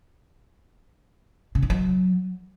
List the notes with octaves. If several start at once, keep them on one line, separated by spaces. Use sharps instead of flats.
C#3
D#3
F#3